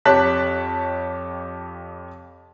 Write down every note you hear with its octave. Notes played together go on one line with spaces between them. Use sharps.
F2 G4 C#5 A5 F#6 B6